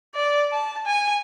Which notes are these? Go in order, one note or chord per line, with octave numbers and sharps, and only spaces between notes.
D5
A5
G#5